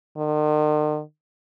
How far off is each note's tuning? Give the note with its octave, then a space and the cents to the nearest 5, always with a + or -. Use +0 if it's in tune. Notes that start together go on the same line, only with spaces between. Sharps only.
D#3 -45